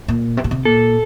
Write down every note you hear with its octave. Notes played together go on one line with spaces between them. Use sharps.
A#2
C3
A#2
C3
A#2 A4